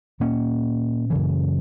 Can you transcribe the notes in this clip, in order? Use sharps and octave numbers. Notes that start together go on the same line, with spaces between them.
A#2 A#3 C#4
F#2 C#3 E3